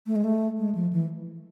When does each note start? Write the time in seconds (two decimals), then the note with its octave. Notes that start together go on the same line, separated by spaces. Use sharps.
0.07 A3
0.16 G#3
0.24 A3
0.58 G#3
0.75 F3
0.93 E3